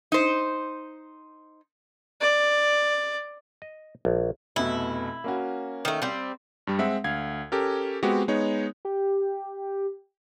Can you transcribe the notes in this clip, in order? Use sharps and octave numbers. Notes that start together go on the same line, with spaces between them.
D#4 C5
D5
D#5
A#1
F1 B2 E4
A#3 C#4 F#4
D#3 A3
G3 C4
G2 G3
G#3 C4 E5 F#5
D2 F5 G#6
C#4 G4 A4 A#4
G#3 B3 C4 F#4 G4
G#3 B3 D#4 C#5
G4